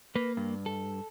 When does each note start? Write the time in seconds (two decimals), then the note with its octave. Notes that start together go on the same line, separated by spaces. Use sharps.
0.16 A#3 B4
0.37 G2
0.66 A4